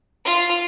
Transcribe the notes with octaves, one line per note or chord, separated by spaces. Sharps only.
F4